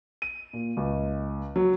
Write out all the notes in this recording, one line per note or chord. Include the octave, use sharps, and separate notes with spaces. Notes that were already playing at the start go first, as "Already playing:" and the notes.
D#7
A#2
C#2
F#3